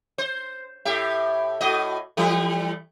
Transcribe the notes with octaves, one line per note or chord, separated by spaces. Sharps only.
C5
A2 G4 E5
A2 F#4 D#5
E3 G3 A3